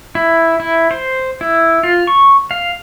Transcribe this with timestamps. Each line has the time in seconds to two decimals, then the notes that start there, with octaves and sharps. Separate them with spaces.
0.15 E4
0.60 E4
0.91 C5
1.41 E4
1.83 F4
2.07 C#6
2.51 F5